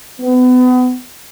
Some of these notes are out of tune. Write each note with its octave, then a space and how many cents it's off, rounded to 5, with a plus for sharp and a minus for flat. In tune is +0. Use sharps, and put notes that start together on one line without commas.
B3 +30